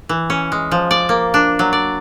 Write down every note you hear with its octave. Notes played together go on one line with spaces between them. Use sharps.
E3
C#4
G#3
F3
D5
A#3
D4
F#3
D5